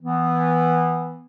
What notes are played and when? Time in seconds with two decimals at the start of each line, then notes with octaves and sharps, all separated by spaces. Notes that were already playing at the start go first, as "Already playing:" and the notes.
0.02 E3 B3